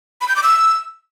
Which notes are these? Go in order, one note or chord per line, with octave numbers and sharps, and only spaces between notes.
B5
G6
D6
E6